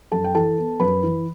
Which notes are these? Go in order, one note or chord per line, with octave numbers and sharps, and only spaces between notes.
F#2 A4 A5
G5
E3 A4 A5
B3
F#2 B4 B5
E3